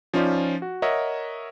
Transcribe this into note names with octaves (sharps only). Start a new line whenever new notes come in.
F3 C#4 D#4 F4 C5 D5
F#4
A#4 C#5 D#5 E5 F#5